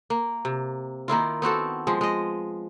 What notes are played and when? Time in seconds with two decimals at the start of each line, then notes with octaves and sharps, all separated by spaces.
0.10 A#3
0.45 C3
1.08 D#3 A#3 E4 F4
1.42 B3 C4 F#4 A4
1.87 F3 G#3
2.01 G#3 D#5